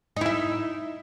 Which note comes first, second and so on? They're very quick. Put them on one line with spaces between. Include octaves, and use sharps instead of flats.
D#4 E4 E5